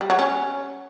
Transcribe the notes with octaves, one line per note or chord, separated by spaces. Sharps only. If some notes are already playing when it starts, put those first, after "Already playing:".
G3
F#3
C#4